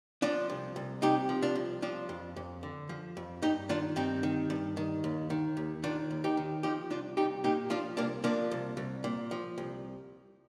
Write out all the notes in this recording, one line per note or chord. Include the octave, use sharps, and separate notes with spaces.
F3 D4 F4
C2
C2
C3 D#4 G4
F3
D4 F4
C2
F3 D4 F4
F2
F2
D3
F3
F2
G2 D#4 G4
D#3 D4 F4
G2 C4 D#4
D#3
G2
D#3
D#2
D#3
D#2
D#3 D4 F4
D#2
D#4 G4
D#3
F3 D#4 G4
C2 D4 F4
C2 D#4 G4
A#2 D#4 G4
F3 D4 F4
C2 A#3 D4
F3 A#3 D4
C2
C2
A#2
F3
C2